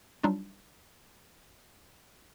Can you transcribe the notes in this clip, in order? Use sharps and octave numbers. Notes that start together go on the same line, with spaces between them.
F#3 G3 D4 D#4 F4